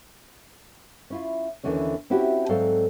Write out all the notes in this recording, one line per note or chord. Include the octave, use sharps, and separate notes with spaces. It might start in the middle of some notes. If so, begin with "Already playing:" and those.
C#4 E4 F4
D#2 D3 E3 C#4 C#5
C4 C#4 E4 F#4 G4
G#2 F#3 C4 A4 D5 F5